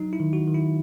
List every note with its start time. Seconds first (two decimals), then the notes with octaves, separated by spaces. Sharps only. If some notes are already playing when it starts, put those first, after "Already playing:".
Already playing: F#3 D#4
0.13 E4
0.20 D#3
0.33 F#4
0.47 D#3
0.54 E4